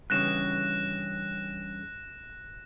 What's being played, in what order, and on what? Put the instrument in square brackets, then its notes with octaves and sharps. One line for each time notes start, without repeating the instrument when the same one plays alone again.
[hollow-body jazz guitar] G2 C#3 E3 [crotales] F#6 A#6 E7